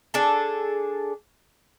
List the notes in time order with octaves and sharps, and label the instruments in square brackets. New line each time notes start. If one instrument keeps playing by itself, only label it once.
[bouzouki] D4 G#4 A4